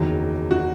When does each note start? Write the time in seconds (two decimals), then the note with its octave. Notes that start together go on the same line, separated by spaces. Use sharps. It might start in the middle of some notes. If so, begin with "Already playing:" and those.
Already playing: F#1 E2 D#3 F#3
0.51 F#4